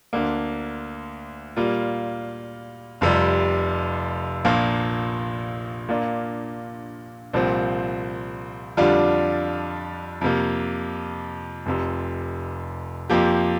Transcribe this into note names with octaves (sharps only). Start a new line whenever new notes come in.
D2 D3 A#3
A#2 G3 A#3 F4
F1 F2 C3 G3
A#1 A#2 F3 A#3
A#2 A#3 D4 F4
C2 A#2 F3 C4
F2 D3 G3 D4 F4
F2 C3 A#3
F1 F2 C3
F2 F3 A#3 G4